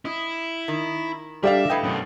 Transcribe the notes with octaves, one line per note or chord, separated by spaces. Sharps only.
E4 D#5
D#3
G3 D4 A4 D5 E5 F5
A2 B4 D#5 G5
F#2 B2